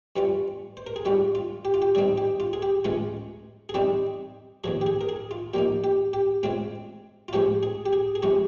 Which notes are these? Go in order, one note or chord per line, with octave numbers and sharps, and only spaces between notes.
G2 G3 C#4 F4
C5
A#4
G#4
G#2 G3 C#4 F4 G4
F4
G4
F4
G4
C#3 G3 C4 D#4 G#4
G4
F4
G#4
G4
C#2 C#3 G#3 C#4 F4
G#4
C2 C3 G3 C4 D#4 G4
D#2 C#3 F3 G#4
G4
G#4
A#4
G#4
F4
A#2 F3 A#3 D#4 G4
G4
G4
C#3 G#3 C4 F4
F4
C#3 F3 G#3 C#4 G4
G#4
G4
G#4
G#4
C3 F3 G#3 C#4 G4